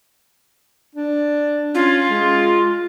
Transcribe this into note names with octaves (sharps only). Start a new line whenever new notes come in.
D4
C#4 F4
G#3